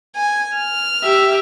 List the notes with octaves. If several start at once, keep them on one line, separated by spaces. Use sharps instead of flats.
G#5
F6
G4 E5